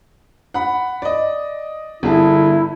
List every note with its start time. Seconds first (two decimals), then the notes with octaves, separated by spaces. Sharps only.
0.54 F#5 B5
1.02 D5 D#5
2.03 G1 E4 G#4 A5